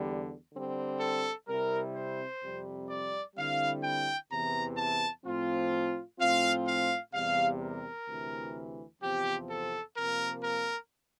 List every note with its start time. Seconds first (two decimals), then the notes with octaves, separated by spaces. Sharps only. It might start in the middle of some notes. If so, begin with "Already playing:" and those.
Already playing: E2 D3 G3
0.53 D3 G3 C4
1.00 A4
1.48 C3 G3 C4 E4 A#4
1.95 C5
2.43 F2 C3 G3
2.89 D5
3.36 D3 G3 C4 E4 F5
3.83 G5
4.31 E2 C3 E3 A#5
4.77 A5
5.25 A2 F3 C4 F4
6.19 A2 F3 C4 F4 F5
6.67 F5
7.14 E2 C3 G3 F5
7.61 A#4
8.07 D2 C3 E3
9.01 E2 C3 F3 C4 G4
9.49 A4
9.96 C3 F3 A#3 A#4
10.43 A#4